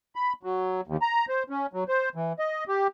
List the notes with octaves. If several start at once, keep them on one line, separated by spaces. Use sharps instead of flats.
B5
F#3
D#2
A#5
C5
C#4
F#3
C5
E3
D#5
G4